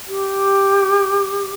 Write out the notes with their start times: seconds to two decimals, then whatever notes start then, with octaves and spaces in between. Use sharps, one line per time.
0.08 G4